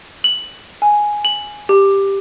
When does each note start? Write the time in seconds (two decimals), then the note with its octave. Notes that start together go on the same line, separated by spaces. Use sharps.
0.24 F#7
0.82 G#5
1.25 F#7
1.69 G4